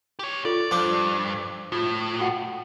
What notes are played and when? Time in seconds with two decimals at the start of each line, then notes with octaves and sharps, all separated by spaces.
0.19 G4 C#5
0.45 F4 A4 D5
0.71 G2 F3 D4 D5
1.72 A2 F4 D#6
2.19 F#4 F#5 G5